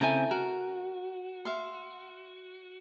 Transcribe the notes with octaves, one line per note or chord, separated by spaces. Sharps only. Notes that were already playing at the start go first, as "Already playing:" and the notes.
C#3 C4 E4 A4 G#5 A#5
F#4 A#4
E5 F5 C6